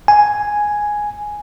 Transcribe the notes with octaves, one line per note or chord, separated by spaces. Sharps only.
G#5